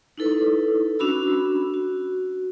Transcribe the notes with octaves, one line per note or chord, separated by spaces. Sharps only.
D#4 E4 A4 B4
C#4 D4 F#4 B5 E6
F#4